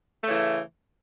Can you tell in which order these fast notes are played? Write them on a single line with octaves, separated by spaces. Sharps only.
A3 C#3 E3